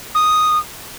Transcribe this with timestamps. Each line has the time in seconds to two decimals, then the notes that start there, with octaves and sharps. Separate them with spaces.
0.15 D#6